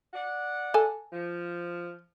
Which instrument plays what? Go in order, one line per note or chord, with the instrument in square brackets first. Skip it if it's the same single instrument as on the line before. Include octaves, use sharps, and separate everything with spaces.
[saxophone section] D5 F#5
[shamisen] A4 G#5
[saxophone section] F3